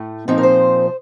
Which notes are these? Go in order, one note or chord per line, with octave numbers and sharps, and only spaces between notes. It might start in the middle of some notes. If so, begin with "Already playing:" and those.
Already playing: A2 A3
A#2 F3 C4 D#4
A#4
C5